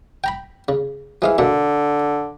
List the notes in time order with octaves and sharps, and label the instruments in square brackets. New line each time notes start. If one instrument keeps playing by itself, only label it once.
[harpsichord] G5 A#5 B5
C#3
[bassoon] E3 [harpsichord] F3 G#3 F5
[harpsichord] B2 A#3 E5 [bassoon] D3